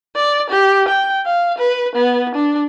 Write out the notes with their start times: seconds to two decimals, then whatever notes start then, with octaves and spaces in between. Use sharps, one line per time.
0.16 D5
0.50 G4
0.88 G5
1.26 F5
1.58 B4
1.95 B3
2.35 D4